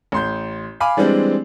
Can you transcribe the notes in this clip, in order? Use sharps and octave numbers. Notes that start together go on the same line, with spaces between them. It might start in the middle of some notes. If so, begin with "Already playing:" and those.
A1 C6 G6
F5 G#5 B5 D6
E3 G3 G#3 C4 D4